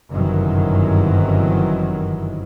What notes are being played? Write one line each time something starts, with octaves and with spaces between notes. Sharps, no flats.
G1 F#2 C3 D#3 E3 F#3